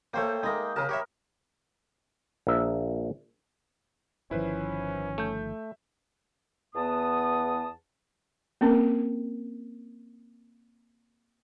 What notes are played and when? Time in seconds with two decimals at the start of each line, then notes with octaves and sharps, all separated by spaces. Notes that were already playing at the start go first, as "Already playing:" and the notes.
0.14 A3 A#3 C5 C#5 G5
0.43 G#3 A#3 D#4 A#5
0.76 C#3 A#4 A5 B5
0.89 G4 C#5 E5
2.47 A#1 A#4 E5
4.31 G1 D#3 F3 C#4 E4 B4 C5
5.18 A3 E5 G6
6.75 E2 B3 A5 D#6
8.61 A#3 C4 C#4 A#4